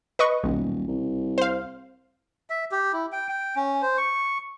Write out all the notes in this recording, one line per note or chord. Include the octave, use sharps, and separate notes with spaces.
B4 D#5 C#6
D#1 B1
C2
C5 F5
E5
G4
E4
G5
G5
C#4
C5
C#6